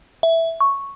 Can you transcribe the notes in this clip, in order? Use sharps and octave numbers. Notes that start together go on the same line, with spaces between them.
E5
C#6